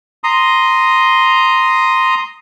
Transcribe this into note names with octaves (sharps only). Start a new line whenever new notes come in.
A#5 C6 D#6